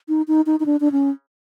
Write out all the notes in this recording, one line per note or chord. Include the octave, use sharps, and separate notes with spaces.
D#4
D#4
D#4
D#4
D4
D4
C#4